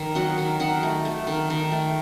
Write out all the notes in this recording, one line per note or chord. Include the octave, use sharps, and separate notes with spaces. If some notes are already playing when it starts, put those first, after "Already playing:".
Already playing: D#3
F#3 D#5 F#5
D#3
D#3 D#5 F#5
A3
A3
D#3
D#3
A3